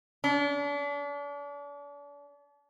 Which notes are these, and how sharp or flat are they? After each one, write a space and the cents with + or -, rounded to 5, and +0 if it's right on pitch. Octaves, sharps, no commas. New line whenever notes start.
D4 -40